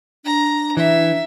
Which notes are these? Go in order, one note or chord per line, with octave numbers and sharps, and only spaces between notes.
D4 A#5
E3 E5